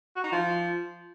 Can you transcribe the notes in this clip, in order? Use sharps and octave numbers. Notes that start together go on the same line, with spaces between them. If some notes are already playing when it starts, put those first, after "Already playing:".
F#4
D#4
F3